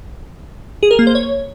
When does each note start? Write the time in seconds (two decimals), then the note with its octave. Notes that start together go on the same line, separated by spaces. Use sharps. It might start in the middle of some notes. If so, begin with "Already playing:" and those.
0.83 G#4
0.91 A#4
0.99 A#3
1.07 C5
1.15 C#5